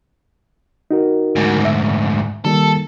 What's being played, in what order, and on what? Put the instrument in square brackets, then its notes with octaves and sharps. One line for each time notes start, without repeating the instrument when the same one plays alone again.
[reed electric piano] D#4 F#4 A#4
[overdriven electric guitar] D2 G#2
[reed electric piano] E5
[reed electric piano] D#3 G3 A#3 [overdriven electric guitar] A4